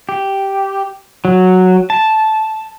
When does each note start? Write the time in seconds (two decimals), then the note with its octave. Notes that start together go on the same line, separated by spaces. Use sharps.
0.09 G4
1.25 F#3
1.90 A5